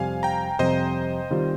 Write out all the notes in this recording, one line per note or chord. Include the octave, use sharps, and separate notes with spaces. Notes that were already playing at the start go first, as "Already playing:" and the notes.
Already playing: F2 C3 G3 C4 F5 G#5
G5 A#5
F2 C3 G3 C4 C5 D#5
D#3 G3 C4 F4